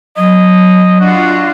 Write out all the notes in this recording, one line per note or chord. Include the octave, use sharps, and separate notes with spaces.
F#3 D#5
D4 F4 F#4 F#5